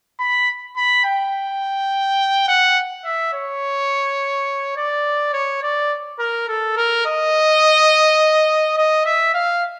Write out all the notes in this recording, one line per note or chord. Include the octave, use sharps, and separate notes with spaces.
B5
B5
G5
F#5
E5
C#5
D5
C#5
D5
A#4
A4
A#4
D#5
D#5
E5
F5